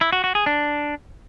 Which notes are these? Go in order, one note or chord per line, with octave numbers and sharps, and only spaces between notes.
E4
F#4
F#4
G#4
D4